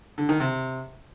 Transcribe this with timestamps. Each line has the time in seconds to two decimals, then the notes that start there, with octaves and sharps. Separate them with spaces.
0.18 D3
0.29 D#3
0.40 C3